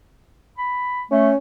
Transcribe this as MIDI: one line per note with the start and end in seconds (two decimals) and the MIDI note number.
0.58 1.03 83
1.11 1.31 57
1.11 1.37 61